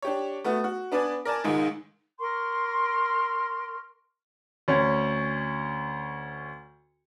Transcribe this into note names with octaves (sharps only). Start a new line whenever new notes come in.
D4 G4 C#5
A3 B3 F#4
F#4
B3 D4 B4 D5 G#5
A#4 D5 G#5 A5
C#2 G#2 D#3 G#3
A#4 C6 C#6 F6
D2 C#4